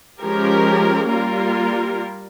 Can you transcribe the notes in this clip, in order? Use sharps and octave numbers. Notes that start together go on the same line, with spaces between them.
F3 G#3 C#4 G4 A#4
G3 A#3 F4 A#4